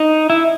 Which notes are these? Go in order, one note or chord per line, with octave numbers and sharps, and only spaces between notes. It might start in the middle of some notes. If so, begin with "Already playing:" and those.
Already playing: D#4
E4